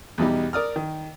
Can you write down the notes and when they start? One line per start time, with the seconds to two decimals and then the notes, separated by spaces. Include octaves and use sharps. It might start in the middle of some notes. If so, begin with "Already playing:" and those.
0.18 E2 B2 G3 D#4
0.53 A#4 D5 D#6 F6
0.76 D#3